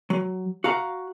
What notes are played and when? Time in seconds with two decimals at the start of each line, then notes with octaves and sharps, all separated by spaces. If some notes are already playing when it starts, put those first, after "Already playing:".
0.10 F#3
0.64 F#4 F5 A#5